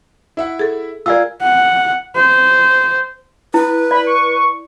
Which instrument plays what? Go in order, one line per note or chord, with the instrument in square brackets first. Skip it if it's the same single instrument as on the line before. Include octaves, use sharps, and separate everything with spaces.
[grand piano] E4 E5 F#5
[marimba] G#4 A4
[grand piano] F4 G#4 A#4 [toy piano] D5 F5 E6
[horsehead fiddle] F#5
C5
[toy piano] E4 [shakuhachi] B4
[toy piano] D5 [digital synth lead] B5
[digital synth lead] C#6